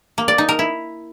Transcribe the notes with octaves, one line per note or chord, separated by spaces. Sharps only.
A#3
D5
D#4
A#4
E4